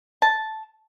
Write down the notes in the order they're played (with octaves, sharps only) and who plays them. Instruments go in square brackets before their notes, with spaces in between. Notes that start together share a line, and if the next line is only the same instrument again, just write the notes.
[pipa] A5